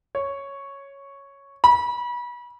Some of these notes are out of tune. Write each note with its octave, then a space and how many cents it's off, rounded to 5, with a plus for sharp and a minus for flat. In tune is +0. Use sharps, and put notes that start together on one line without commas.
C#5 +0
B5 -30